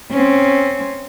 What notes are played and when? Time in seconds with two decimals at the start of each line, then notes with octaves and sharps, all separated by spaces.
0.11 C4 C#4